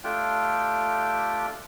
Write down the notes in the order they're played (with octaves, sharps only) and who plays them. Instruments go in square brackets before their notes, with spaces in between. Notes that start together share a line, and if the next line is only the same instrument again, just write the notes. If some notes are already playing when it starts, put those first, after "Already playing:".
[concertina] A3 D4 F4 G4 G5